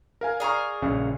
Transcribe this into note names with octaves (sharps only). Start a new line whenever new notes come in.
A#4 F5 G#5
G#4 A#4 D5 F5 C#6
A#1 C#3